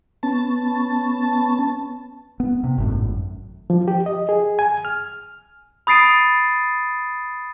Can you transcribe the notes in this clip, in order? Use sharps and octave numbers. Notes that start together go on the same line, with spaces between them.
B3 C#4 A5
B3
C3
G#1 F#2 A2
F3
G4
D#5
G#4
G#5
F6
B5 D#6 A6 C7 D7 D#7